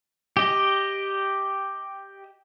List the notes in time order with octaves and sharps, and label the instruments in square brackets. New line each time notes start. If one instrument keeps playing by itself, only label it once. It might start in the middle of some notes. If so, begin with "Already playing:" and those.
[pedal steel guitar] G4 D#5